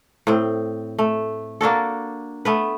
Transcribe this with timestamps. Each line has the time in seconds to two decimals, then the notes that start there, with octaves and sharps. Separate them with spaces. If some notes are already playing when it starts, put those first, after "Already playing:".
0.27 A2 C4
0.98 A3
1.61 A#3 D4 F#4 A4
2.45 A3 B3 B4